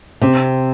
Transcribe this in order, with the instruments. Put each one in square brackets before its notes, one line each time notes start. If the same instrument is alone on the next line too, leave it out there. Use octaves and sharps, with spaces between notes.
[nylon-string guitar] C3 [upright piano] C4